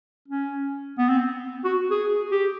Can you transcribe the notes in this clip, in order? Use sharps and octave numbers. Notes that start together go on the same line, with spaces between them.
C#4
B3
C4
F#4
G#4
G4